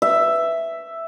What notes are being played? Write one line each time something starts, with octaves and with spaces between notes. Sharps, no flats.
E5